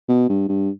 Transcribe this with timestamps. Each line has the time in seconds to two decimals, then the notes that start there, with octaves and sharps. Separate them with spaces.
0.09 B2
0.29 G2
0.48 G2